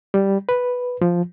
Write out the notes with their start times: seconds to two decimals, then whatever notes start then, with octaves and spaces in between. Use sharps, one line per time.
0.14 G3
0.49 B4
1.01 F3